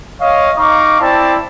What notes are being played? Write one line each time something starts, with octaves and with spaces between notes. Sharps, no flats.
C#5 D#5 F5
D#4 F5 A#5 C#6 D6
C4 E4 D5 A5